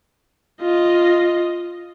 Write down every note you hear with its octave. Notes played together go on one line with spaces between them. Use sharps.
F4 D#5